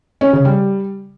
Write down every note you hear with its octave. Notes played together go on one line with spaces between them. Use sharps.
C#4
C#3
G3